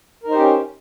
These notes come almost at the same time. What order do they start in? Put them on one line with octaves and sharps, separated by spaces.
A#4 D#4 C5 G4 C#4